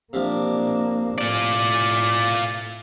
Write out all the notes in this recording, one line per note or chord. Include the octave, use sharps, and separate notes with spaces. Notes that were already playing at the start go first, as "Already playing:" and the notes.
C3 F3 A#3 D4
A2 F4 D5